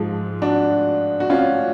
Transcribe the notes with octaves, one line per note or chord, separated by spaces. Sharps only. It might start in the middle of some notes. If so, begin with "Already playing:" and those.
Already playing: G#2 F3 G#3 F4 G#4
D4 F#4
F#4
C#4 F4